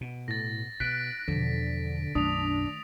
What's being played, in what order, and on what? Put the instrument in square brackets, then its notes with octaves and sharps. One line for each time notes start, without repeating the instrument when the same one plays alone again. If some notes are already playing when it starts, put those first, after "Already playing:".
[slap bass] B2
[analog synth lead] A2 [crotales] A6 A#6
[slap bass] B2 [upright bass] D#4 E4 [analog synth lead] F#6 [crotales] B6 D7
[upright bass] E2 B2 [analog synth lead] D3 [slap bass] F3
[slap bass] B1 F#2 [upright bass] D#3 A3 [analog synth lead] D4 [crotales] D#6 F7